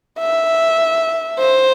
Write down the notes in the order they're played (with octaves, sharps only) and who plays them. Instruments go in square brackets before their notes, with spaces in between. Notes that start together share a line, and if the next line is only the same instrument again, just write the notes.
[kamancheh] E5
C5